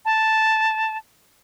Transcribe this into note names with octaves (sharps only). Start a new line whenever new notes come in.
A5